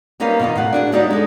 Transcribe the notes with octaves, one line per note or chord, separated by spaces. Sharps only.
G3 A#3 C#4 D#4 B4 F5
B2 D#3 D#4 F4 D#5
A2 F5 F#5
D4 F#4 G#4
D2 G3 B3 D#4 C#5 D5
G#3 D#4 A4